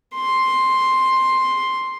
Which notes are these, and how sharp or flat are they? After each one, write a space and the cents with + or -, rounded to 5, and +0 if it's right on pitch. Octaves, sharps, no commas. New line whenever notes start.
C6 +5